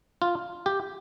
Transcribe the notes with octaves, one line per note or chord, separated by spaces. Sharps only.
F4
G4